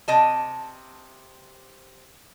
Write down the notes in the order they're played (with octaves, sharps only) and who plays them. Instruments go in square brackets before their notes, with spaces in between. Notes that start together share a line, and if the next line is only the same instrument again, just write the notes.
[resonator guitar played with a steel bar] C3 D#5 A5